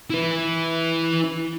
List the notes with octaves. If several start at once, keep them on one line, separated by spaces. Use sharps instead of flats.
E4 B4